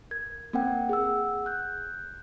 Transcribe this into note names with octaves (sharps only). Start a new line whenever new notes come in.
A#4 G#6
A#3 C4 A#4 F#5 G5
G#4 F#5 E6
F#6 G6